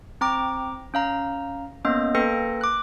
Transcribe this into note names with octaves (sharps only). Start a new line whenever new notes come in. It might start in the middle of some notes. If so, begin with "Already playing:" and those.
C4 G5 A#5 D6
C#4 F5 A#5
A#3 B3 C#4 D#5
A#3 A4 B4 G5 A#6 C#7
D6 F#6